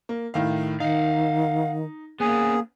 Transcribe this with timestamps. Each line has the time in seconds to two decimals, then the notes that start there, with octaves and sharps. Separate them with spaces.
0.09 A#3
0.34 A2 D#3 F5
0.80 D#3 D#4 F5 F#5
2.20 A#3 B3 C#4 G#4